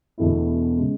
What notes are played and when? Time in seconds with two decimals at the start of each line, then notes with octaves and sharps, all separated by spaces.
0.18 E1 E2 B2 A3 E4
0.78 C#3 G#3